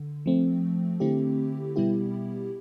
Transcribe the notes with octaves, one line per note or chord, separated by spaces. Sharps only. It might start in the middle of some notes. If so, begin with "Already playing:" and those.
Already playing: D3
F3 A3 C4
D3 A3 C4 E4 G4
B2 G3 B3 E4 G4